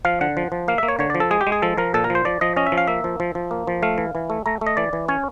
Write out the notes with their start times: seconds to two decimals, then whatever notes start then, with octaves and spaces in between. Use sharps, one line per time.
0.05 F3 F5
0.21 D3 F#5
0.37 F3
0.52 F3
0.68 A#3 F5
0.78 E5
0.83 A#3
0.88 C#5
0.99 D3 C#5
1.10 D5
1.15 F3
1.20 A4
1.31 G#3 G#4
1.41 G4
1.47 G#3
1.52 G#4
1.62 F3 A4
1.78 F3 A#4
1.94 A#2 A4
2.04 A#4
2.10 F3
2.15 C5
2.25 F3 D5
2.41 F3 D#5
2.56 C#4 D#5
2.67 E5
2.72 F3
2.78 F5
2.88 A#3 E5
3.04 F3
3.20 F3
3.35 F3
3.51 A#3
3.67 F3
3.83 A3 F5
3.98 E3
4.15 E3
4.30 A3
4.46 A3 A#5
4.61 A3
4.67 D#5
4.77 E3 D5
4.93 E3
5.08 C#4 C#5